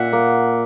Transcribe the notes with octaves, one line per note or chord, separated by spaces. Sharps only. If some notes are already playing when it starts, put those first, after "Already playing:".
Already playing: A#2 E5 F#5
A#3